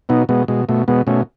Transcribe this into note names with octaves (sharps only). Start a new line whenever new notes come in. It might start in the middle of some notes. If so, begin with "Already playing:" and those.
B2 B3 D#4
B2 G#3 B3
B2 G#3
B2 A3
B2 G#3 B3
B2 A3 C#4